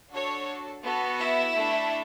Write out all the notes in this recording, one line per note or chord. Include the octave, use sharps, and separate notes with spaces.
D4 F#4 A4 C#5
B3 F#4 A4
E4 E5
A3 D4 A4